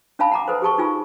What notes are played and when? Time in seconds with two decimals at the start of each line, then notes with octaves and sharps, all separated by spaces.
0.19 C#4 D4 E5 F5 A5 B5
0.32 F#5 A#5 D6
0.48 A4 B4 C5
0.62 G4 G#4 A5 C#6
0.78 D#4 F4 G#5